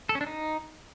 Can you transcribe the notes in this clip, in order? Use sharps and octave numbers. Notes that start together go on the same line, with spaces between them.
A4
C#4
D4
D#4